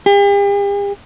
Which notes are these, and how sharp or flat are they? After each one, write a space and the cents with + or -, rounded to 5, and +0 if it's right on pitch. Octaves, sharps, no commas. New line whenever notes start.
G4 +45